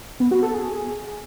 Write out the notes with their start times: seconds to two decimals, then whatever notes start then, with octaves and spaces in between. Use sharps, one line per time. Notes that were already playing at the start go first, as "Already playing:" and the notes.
0.20 B3
0.31 F#4
0.43 A4
0.54 G#4